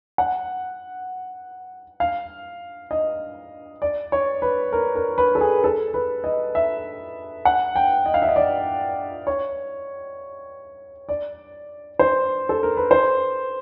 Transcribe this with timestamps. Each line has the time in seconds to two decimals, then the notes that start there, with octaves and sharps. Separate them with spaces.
0.18 F#5
2.00 F5
2.91 D#5
3.82 D5
4.12 C#5
4.42 B4
4.73 A#4
4.96 A#4
5.18 B4
5.35 A4
5.41 G#4
5.64 A4
5.94 B4
6.24 D#5
6.55 E5
7.45 F#5
7.76 G5
8.06 D#5
8.14 F5
8.22 E5
8.29 D#5
8.36 D5
9.27 C#5
11.09 D5
11.99 C5
12.49 A4
12.63 A#4
12.77 B4
12.91 C5